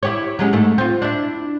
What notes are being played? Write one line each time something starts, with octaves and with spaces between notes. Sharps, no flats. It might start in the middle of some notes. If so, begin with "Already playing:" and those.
E4 G4 C#5
F#3 G#3 C#4
G#2 A3
C4 F4
D4 E4